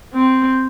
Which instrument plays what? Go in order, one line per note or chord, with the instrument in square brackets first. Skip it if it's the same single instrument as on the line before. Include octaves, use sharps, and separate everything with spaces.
[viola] C4